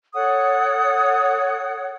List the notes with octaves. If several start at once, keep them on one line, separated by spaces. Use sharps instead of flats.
A4 C#5 F#5 D#6